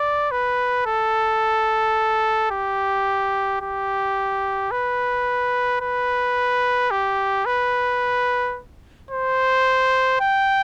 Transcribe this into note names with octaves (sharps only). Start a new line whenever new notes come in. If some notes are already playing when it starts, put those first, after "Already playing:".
Already playing: D5
B4
A4
G4
G4
B4
B4
G4
B4
C5
G5